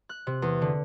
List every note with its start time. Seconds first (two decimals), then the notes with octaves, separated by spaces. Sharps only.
0.09 F#6
0.27 C3
0.42 E2
0.62 D3